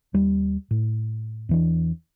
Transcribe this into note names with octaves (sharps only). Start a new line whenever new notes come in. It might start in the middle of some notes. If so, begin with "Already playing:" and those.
D#2 G3
A2
E2 E3 D4